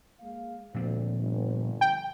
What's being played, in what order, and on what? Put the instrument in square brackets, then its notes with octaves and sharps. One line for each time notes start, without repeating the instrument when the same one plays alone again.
[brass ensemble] G#3 A#3 F5
[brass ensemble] D2 [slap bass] A#2 F3 C4
[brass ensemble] G1
[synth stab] G5